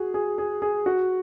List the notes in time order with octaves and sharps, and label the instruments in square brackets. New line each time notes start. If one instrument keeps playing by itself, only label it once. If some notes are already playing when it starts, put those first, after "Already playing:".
Already playing: [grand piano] F#4 G#4
G#4
G#4
G#4
F#4